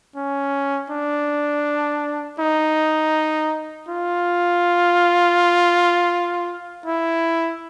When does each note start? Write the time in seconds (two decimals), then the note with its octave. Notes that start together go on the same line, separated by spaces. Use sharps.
0.16 C#4
0.90 D4
2.39 D#4
3.88 F4
6.86 E4